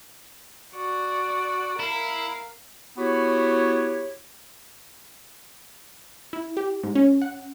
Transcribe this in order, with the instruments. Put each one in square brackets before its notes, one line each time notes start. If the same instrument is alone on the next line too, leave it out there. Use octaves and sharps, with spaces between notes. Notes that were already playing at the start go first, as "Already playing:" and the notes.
[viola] F#4 D5
[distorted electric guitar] E4 [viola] A#4 F5
[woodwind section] B3 E4 F#4 G4 C#5
[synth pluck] E4
G4
G#2
C#4
F#5